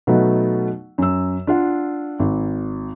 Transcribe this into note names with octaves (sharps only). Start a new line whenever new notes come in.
B2 F#3 A3 B3 D#4
F#2 E6
D4 F4 F#5
G#1